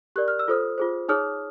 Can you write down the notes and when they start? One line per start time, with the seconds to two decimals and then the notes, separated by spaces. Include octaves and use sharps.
0.16 G4 A#4 D5 F#6
0.28 F6
0.39 E6
0.48 F4 A4 C5 D#6 F6
0.78 F4 G#4 C5
1.09 D#4 G#4 C#5 D#6 F6